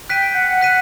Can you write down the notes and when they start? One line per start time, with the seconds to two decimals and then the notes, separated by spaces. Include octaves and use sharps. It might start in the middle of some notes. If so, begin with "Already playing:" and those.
0.09 G5 F#6 B6 D#7
0.35 F#5
0.61 F#6 B6 D#7